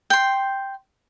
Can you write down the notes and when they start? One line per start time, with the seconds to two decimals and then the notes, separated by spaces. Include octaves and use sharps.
0.10 G5 C6